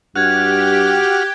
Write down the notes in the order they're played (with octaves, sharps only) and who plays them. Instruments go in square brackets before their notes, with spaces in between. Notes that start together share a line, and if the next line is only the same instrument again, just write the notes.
[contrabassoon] G2 [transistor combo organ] F#4 F6 [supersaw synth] G4 [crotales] F#6 G#6